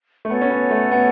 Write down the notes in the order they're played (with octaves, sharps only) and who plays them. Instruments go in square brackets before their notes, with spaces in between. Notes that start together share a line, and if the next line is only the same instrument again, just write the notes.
[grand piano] A3
[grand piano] B3 [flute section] F#4 A4 C#5 G#5
[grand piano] C#4
B3
A3
B3